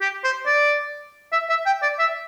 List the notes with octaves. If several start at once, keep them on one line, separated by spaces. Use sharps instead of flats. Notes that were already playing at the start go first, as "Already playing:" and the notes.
G4
C5
D5
E5
E5
G5
D5
E5